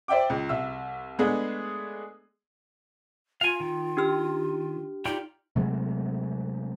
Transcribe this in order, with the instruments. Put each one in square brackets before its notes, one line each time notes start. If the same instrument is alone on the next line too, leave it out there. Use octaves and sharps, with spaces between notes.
[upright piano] C5 D5 E5 G5 D6
C#2
C2 E5 E6
G#3 A3 B3 D4 G#4
[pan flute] F4 [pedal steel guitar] F5 G#5
[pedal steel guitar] D#3
[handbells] D4 G4 F6
[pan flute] D#4 [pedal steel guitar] F4 G4 D5
[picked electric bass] C3 F#3 G#3 A3